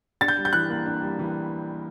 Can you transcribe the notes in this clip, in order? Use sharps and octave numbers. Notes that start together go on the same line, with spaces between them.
D4 A6
G6
G3
G6
E3 F#6
A#3
D4
G3
E3